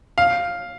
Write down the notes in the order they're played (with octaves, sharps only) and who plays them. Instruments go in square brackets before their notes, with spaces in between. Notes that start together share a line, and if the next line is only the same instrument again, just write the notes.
[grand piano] F5